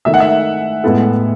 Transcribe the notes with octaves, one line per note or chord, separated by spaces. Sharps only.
D#3 A3 D#4 E5
F#5
E5
A2 G#3 B3 E4 A4